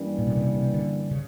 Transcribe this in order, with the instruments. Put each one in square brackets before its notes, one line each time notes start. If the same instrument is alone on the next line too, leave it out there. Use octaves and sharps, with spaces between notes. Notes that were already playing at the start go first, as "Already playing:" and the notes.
Already playing: [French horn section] G2 E3 G3 A#3 C#4
[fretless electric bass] A#2
B2
C3
C3
D3
C#3